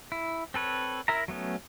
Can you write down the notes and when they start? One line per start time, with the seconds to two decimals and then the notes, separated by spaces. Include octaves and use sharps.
0.12 E4
0.54 C4 A4 B4 C#5
1.08 E4 A#4 E5 A#5
1.28 F#3 A3 B3 C#4